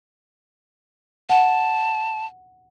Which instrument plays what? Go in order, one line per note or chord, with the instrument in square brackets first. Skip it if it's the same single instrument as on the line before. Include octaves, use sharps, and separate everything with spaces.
[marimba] F#5 [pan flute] A5